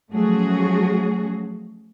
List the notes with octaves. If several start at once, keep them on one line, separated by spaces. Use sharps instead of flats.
F3 F#3 A3 C#4 F#4 G#4